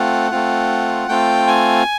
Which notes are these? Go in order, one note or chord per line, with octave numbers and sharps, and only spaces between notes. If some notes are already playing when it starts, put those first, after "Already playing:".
Already playing: A3 C4 F4 F#5
A3 C4 F4
A3 C4 F4 G5
G#5